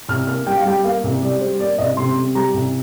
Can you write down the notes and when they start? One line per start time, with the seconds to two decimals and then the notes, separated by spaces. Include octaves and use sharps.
0.09 C2 F6
0.27 A#3 F6
0.47 G3 G5
0.57 F5
0.65 G3 G5
0.84 A#3 F5
1.04 C2
1.22 G3 D5
1.41 G3 C5
1.60 A#3 D5
1.79 C2 D#5
1.97 C3 C6
2.17 C3
2.35 G3 A#5
2.54 C2